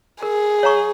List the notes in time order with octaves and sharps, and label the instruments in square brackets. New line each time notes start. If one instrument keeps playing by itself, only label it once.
[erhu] G#4 [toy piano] A#4
[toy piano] C#5 F5 A#5 C#6